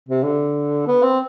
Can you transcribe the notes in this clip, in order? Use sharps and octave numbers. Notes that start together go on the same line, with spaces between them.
C3
D3
B3
C4